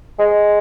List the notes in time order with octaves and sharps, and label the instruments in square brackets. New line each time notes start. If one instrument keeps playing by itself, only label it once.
[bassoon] G#3